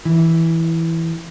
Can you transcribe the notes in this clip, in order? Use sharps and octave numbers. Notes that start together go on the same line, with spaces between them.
E3